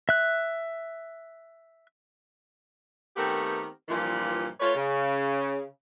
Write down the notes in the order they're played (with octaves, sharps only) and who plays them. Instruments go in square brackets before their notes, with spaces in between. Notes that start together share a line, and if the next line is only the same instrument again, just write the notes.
[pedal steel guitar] E5 F#6
[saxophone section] D#3 A3 B3 C4 G4 A#4
G2 A#2 E3 F3
A3 F4 B4 C#5
C#3